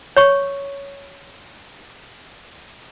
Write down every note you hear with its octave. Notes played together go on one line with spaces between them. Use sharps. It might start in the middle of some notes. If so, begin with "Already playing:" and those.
C#5 C#6